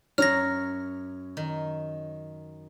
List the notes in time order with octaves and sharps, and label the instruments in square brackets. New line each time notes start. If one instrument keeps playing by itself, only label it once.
[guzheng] F#2 C#5 A#5 [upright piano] C#4 [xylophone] F6 A#6
[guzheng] D#3